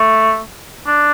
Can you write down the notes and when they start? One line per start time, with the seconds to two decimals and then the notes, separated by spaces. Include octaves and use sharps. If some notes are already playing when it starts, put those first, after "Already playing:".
Already playing: A3
0.87 D4